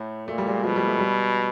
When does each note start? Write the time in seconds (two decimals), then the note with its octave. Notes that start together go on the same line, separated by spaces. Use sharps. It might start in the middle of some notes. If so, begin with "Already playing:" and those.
Already playing: A2 A3
0.28 A#2 A3
0.38 G3
0.47 G#3
0.64 B2 F3
0.76 G3
0.87 A3
0.99 G3